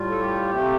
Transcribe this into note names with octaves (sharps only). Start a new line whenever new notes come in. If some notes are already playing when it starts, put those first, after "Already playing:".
Already playing: A2 G3 F4
A4
G4
C3 A3 C4